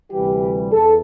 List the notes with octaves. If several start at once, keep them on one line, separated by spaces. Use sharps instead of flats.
D2 C3 E3 G3 G4
E2 A4